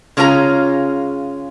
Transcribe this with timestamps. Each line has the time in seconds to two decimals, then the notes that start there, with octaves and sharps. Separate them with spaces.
0.17 C#3 G#3 C#4 F4 G#4 A#5